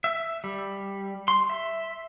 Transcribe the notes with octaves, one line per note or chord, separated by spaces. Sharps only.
E5
G3
C6
E5